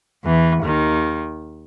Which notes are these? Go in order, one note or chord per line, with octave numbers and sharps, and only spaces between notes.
E2 E3
D#2 D#3